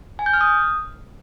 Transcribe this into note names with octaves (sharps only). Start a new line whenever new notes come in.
G#5
G6
F6
D#6